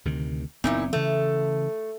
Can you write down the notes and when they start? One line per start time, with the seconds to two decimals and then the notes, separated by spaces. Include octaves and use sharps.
0.05 D2 C3 D#3
0.64 F#1 A#2 B3 C4 D#4 E4
0.93 C#3 E3 A3